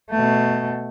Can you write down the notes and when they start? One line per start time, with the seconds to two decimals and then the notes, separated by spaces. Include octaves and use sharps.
0.11 B2 A3